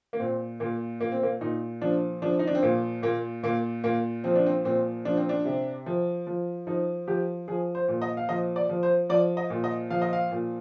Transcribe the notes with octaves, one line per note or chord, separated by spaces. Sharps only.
A#3
A#2 C4
A#2 A#3
A#2 A#3
C4
A#3
A#2 D#4
F3 D4
F3 D4
D#4
D4
C4
A#2 A#3
A#2 A#3
A#2 A#3
A#2 A#3
F3 C4
D4
C4
A#2 C4
F3 D4
C4
D4
C3
F3
F3
F3 D#4
F3 G4
F3 G#4
C5
A#2
D#5
F5
F3 D#5
D5
F3
C5
F3 D5
D#5
A#2
D#5
F3 F5
D#5
F5
A#2